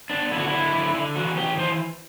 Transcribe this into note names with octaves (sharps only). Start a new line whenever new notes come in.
B3 D4
D3 E4
F#4
D3 E4
D3
D3
E3 F#4
E3 G4
E3 C5